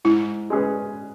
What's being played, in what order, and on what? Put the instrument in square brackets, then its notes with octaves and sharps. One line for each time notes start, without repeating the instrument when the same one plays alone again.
[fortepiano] G#2 [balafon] E4
[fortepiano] G#3 C#4 G#4 B4